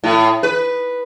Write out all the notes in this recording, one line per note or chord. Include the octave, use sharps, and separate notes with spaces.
A2
B4